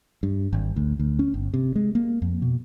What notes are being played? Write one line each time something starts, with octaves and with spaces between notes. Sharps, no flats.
G2
G#1
D2
D2
C#4
G1
C3
G#3
A#3
F2
B2